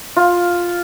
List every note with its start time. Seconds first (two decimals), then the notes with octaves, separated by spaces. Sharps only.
0.16 F4